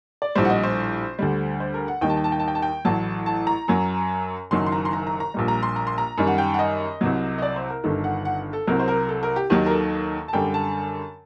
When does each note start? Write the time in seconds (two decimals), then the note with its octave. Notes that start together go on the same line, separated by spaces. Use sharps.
0.22 D5
0.35 A#1 A2 G3 C5
0.45 F#5
0.50 D#5
0.64 C5
1.19 D2 D3 G3
1.60 C5
1.74 A#4
1.88 F#5
2.01 D#2 D#3 G3 G5
2.10 A5
2.17 G5
2.24 A5
2.32 G5
2.40 A5
2.48 G5
2.55 A5
2.62 G5
2.85 A1 A2 F#3 A5
3.26 A5
3.47 A#5
3.68 F#2 F#3
4.51 F#1 F#2 D#3 F#3 C6
4.66 C6
4.72 A#5
4.85 C6
4.93 A#5
5.07 A#5
5.20 A#5
5.34 A#1 A#2 G3
5.48 A#5
5.63 C6
5.76 A#5
5.87 C6
5.98 A#5
6.18 F#2 D#3 G3
6.27 F#5
6.38 G5
6.54 F#5
6.59 D#5
7.01 C2 C3 F#3
7.38 D#5
7.42 D5
7.56 C5
7.70 A#4
7.84 G1 G2 D#3 A4
8.04 F#5
8.25 F#5
8.53 A4
8.67 C2 C3 F#3 A#4
8.79 C5
8.88 A#4
9.09 A4
9.23 A#4
9.36 G4
9.50 D#2 D#3 F#3 G4
9.66 A#4
9.71 A4
10.28 A5
10.33 F#2 D3 G3 G5
10.54 A5